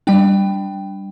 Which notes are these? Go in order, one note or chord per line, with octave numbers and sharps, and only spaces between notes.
G3 D4 G5